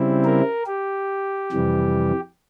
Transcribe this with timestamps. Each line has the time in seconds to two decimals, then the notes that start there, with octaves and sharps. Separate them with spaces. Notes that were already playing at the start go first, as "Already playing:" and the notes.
Already playing: C#3 G3 C4 E4
0.24 A#4
0.67 G4
1.52 F2 C3 E3 G3